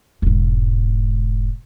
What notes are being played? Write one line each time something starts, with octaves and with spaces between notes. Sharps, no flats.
E1 G#2